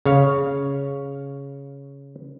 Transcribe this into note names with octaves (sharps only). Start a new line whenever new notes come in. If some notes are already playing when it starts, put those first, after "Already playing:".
C#3 C#5 F5